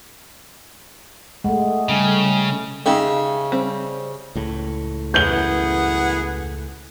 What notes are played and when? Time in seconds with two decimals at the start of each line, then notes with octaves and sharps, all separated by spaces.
1.44 G#3 A3 F#5
1.89 C#3 G3 G#5
2.86 C#3 G#3 D#4 G4 E5
3.52 G3 C4
4.35 C#2 A2
5.14 F#2 E3 B3 G#4 F#5 G6 G7